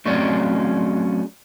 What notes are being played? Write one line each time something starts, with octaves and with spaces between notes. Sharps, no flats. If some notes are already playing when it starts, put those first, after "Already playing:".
F#3 A3 C4 C#4 G#4 D5